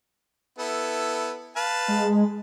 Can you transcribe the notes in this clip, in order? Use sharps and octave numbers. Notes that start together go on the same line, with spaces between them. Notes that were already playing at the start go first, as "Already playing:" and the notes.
B3 E4 A4
B4 F5 A5
G#3